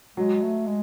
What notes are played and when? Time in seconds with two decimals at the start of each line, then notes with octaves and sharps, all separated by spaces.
0.17 F#3 G#3
0.42 A3
0.67 G#3